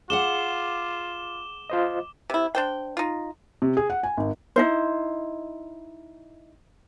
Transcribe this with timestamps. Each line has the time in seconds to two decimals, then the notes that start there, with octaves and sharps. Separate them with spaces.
0.10 F4 G#4 F5 F#5 D6 E7 G7
1.70 F4 C5 D#5
2.30 C3 E4
2.55 D4 C5 G5
2.97 D#4 F4
3.62 C3
3.77 G#4
3.90 F#5
4.03 G#5
4.17 G#1
4.56 D#4 E4 C5